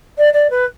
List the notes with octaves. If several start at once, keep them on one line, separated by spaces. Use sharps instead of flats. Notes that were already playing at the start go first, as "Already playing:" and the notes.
D5
D5
B4